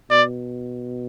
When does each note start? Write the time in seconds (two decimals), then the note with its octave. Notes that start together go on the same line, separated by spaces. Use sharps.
0.11 B2 D5